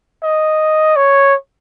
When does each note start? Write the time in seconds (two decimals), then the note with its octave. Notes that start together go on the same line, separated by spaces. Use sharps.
0.23 D#5
0.96 C#5